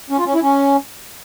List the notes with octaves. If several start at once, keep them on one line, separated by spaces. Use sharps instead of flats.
C#4
F4
C#4
E4
C#4